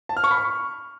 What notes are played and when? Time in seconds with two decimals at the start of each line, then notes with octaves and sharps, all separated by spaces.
0.09 A5
0.17 F6
0.24 C#6
0.31 B5
0.38 C#6